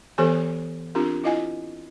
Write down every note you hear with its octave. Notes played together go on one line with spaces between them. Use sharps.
E3 B3 G4 A4 C5 G#5
C4 D4 F4 G4 A#4
E4 F4 D#5 F5 G#5